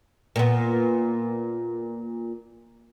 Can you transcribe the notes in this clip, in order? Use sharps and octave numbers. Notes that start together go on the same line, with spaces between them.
A#2 B3